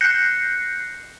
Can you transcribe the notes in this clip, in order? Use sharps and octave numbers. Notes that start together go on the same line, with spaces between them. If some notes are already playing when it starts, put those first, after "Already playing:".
F#6 G6 A#6 C7 C#7